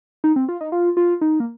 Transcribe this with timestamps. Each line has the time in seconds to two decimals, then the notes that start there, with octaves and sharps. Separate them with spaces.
0.24 D#4
0.36 C4
0.49 F4
0.61 D#4
0.72 F4
0.97 F4
1.21 D#4
1.40 A#3